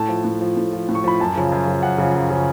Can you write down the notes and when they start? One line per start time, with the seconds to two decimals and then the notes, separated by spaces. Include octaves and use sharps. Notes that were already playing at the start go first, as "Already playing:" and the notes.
Already playing: A2 A5
0.09 F3
0.25 A2
0.41 F3
0.57 A2
0.73 F3
0.89 A2
0.95 C#6
1.04 F3 B5
1.20 F#2 A5
1.36 C#3 F3
1.52 F#2
1.67 C#3 F3
1.83 F#2 F#5
1.98 C#3 F3
2.15 F#2
2.30 C#3 F3